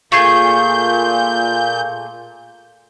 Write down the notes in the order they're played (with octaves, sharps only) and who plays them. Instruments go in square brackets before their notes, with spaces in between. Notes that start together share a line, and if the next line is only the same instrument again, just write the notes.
[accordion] A#2 G6 [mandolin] A3 G#4 [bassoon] F4